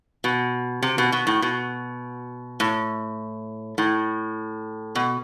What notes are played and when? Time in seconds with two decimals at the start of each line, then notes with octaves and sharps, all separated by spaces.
0.24 B2
0.83 C3
0.98 B2
1.12 B2
1.27 A2
1.42 B2
2.60 A2
3.78 A2
4.95 B2